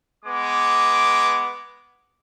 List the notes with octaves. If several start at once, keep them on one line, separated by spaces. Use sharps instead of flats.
G#3 B3 D6